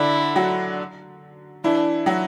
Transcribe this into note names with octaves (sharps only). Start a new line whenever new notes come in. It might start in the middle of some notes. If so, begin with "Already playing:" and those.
Already playing: D3 D4 E4
F#3 F#4
E3 D4 E4
F#3 F#4